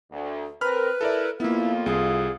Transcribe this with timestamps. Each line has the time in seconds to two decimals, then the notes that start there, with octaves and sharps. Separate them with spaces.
0.12 D2
0.61 C4 A#4 B4 B5 F6
1.01 E4 A4 A#4 D5
1.40 F2 A#3 B3 E4 F4
1.86 C2 G#4